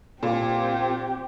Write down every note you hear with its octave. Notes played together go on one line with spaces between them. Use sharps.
A#2 C4 G4